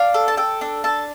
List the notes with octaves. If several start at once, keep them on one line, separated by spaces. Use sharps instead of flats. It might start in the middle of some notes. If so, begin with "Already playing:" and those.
Already playing: D4 F5
A4
A5
A4 G5
D4
A4 A5